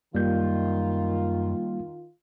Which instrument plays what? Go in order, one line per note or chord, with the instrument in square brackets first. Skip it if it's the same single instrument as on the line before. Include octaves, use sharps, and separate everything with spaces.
[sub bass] F#2 [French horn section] D#3 F4 [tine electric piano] G3 A#3 G6